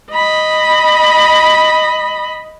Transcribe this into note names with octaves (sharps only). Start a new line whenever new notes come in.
D#5 B5